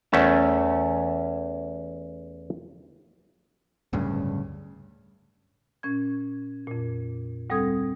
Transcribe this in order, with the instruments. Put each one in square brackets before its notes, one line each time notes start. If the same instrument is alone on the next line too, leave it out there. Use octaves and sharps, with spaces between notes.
[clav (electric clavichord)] E2 A3 C#4 A5
[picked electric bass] D1 D2 G2 C#3
[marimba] A#2 C#4 G#6
F2 A#2
D2 G3 C4 A4 D#6 G#6